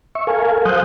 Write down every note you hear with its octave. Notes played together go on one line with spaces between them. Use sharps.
E5 C#6
A4 A#4 F5 G#5
F#3 C5 F5 D#6 F#6 G6